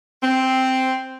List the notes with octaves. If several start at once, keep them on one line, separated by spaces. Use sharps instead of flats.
C4